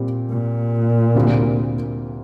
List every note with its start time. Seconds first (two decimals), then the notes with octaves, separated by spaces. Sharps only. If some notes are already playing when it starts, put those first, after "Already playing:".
Already playing: A#2 G3 C4
0.30 A#2
1.15 D2 C3 G3 A#3